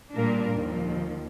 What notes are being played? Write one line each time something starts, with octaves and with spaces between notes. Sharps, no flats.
A#2 G3 A#3 D4 A#4
D#2 F3